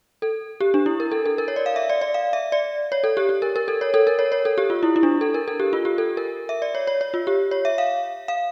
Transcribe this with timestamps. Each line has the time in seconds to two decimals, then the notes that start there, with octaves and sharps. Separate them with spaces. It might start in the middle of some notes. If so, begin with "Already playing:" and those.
0.22 A4
0.60 G4
0.74 D4
0.86 E4
1.00 A#4
1.11 A4
1.25 A4
1.38 A#4
1.48 C#5
1.56 D5
1.66 F5
1.76 E5
1.89 D5
2.01 D5
2.14 F5
2.33 E5
2.52 D5
2.92 C#5
3.04 A4
3.17 G4
3.29 G4
3.42 A#4
3.56 A#4
3.68 A4
3.81 C#5
3.94 A4
4.07 A#4
4.19 C#5
4.32 C#5
4.45 A4
4.58 G4
4.70 F4
4.83 E4
4.96 E4
5.03 D4
5.21 A4
5.34 A#4
5.48 A4
5.60 G4
5.73 F4
5.85 G4
5.98 A4
6.17 A#4
6.49 E5
6.62 D5
6.75 C#5
6.87 C#5
7.01 C#5
7.14 F4
7.27 G4
7.51 C#5
7.65 E5
7.78 F5
8.28 F5